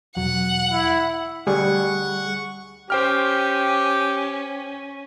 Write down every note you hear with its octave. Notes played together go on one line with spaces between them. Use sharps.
E1 F#3 F#5
E4
D2 G3 G#4 F#5 C#6
C#4 G4 C5 G5 F6